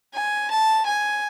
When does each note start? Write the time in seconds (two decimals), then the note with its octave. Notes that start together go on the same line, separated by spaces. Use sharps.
0.14 G#5
0.51 A5
0.86 G#5